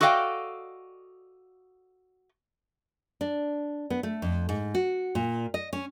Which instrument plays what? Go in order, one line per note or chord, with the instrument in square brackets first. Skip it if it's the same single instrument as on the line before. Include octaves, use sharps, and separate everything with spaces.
[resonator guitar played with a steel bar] F#4 A4 D5 D#5 F5 G5
[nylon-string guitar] D4
B3
A3
F2
G#2
F#4
A#2
D#5
C#4